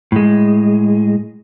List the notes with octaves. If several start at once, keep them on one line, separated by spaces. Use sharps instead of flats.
A2 G#3